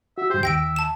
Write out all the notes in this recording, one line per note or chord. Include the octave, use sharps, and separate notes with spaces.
F#4 E5
G2 G4 C5
D#2 E5 G5 A#6 D7
A5 E7